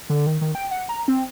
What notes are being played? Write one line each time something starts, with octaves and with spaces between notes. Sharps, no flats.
D3
D#3
D#3
G5
F#5
A#5
C4